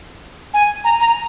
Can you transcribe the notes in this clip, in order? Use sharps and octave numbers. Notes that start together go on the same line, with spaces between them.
G#5
A#5
A#5